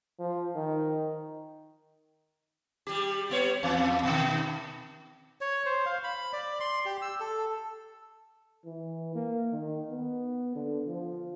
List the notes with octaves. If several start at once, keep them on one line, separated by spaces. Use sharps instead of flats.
F3
D#3
G3 G4
G3 B3 C#5
E2
B2 D#3
C#5
C5
F5
B5
D5
C6
G4
E6
A4
E3
A#3
D#3
B3
D3
F3